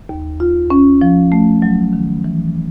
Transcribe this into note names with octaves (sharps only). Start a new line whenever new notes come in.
D#2
F4
C#4
F3
A3
F#3
D#3
E3